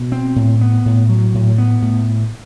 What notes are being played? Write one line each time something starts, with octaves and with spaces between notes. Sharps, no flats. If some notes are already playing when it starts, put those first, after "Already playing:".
Already playing: B2
C4
A2
B3
A2
F#3
A2
B3
A2